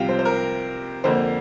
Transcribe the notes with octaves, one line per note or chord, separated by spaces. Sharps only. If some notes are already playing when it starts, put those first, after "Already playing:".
Already playing: C2 C3 F3 F5 G5
C5
C5
A#4
F2 D3 A#3 C5